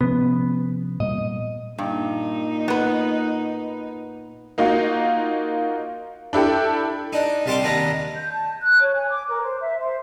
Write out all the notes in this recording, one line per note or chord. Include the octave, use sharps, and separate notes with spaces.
C3 F3 B3 C#4
A#2 G3 B3 D#5
G2 A#2 D#4
B3 B4
A#3 D#4 F4 F#4
D4 E4 G4 A4
D4 D#4
C2 G3 A5 C6 D6
D#2 B3 D4 A#5
G6
A5
F#6
C#5
G#5
D6
A#4
C5
E5
C5